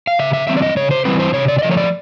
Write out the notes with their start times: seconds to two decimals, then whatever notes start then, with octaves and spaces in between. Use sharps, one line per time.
0.07 F5
0.19 C#3 E5
0.33 E5
0.47 E3 G3 C4 E5
0.57 D5
0.62 D#5
0.76 C#3 C#5
0.91 C5
1.05 E3 G3 C4 B4
1.20 C5
1.34 C3 C#5
1.48 D5
1.59 D5
1.63 F3 A3 D#5
1.71 C#5
1.77 D5